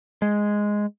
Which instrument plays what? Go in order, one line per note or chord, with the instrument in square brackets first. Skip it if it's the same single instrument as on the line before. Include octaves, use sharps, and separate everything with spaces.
[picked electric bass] G#3